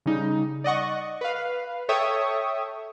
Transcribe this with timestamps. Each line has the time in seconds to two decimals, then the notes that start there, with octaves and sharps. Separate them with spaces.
0.06 C#3 G3 D#4
0.64 D5 D#5 F#5 C#6
1.21 B4 F5
1.89 A4 C#5 E5 G5 C#6 D#6